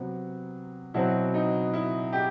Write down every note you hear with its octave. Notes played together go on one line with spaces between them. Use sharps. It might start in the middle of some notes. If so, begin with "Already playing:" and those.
Already playing: C3 F#3 B3
B2 F#3 C4 E4
D#4
E4
G4